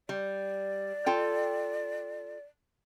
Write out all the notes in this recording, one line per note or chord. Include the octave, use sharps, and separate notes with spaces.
G3 D5
F4 A4 G5